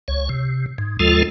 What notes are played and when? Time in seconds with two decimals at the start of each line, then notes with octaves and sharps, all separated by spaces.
0.08 C#2 C#5
0.29 C3
0.78 G#2
1.00 D#2 F3 G#3 F4 A4